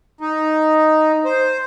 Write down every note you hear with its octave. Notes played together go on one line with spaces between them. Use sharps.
D#4
C5